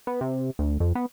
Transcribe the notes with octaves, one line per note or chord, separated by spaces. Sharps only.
B3
C3
D2
F2
B3